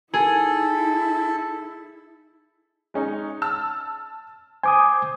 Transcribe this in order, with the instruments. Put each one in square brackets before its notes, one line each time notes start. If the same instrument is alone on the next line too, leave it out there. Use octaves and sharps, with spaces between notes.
[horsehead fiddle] D#4 E4 [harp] G#4 [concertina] A4
[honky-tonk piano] G#3 C#4 D#4
A5 E6 F6
[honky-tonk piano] C5 [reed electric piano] G#5 D6 D#6